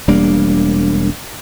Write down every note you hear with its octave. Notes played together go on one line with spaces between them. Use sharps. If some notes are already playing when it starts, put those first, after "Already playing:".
E1 G3 A#3 D4